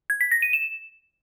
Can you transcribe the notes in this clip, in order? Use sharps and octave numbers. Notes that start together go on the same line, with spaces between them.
G#6
B6
A#6
D#7
E7